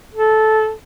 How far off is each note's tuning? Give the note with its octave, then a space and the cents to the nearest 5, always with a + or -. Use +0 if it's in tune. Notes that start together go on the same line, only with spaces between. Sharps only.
A4 -15